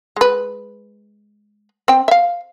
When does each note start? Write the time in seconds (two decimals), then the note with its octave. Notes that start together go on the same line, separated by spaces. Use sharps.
0.16 G#3 B4
1.88 C4 G5
2.08 E5 F5